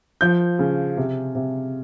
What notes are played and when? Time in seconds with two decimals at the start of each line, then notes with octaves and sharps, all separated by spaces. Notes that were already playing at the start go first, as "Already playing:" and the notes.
0.21 F3 G6
0.59 C#3
0.97 C3
1.35 C3